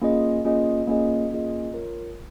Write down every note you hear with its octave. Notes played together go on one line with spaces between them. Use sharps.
A#3 C#4 F4 G#4 D#5
A#3 C#4 F4 G#4 D#5
A#3 C#4 F4 G#4 D#5
A#3 C#4 F4 G#4 D#5
F4 A#4 C#5